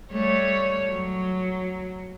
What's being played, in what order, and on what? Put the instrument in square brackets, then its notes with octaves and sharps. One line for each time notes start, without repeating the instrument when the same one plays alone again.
[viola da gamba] G3 A3 C#5
F#3